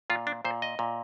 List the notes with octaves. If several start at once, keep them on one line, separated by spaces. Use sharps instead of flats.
A#2 F4
D4
A#2 C5
D#5
A#2